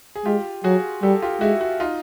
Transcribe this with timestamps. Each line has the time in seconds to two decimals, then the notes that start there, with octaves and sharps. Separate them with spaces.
0.16 G#4
0.25 G#3 F4 G4
0.64 F#3 F#4 G#4
1.02 G3 G4 A4
1.22 F4 G4
1.41 G#3 E4 F#4
1.61 E4 F#4
1.80 D#4 F4